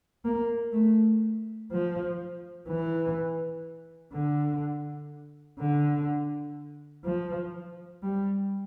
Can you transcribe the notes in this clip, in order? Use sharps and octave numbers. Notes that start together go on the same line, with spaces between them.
A#3
A3
F3
E3
D3
D3
F3
G3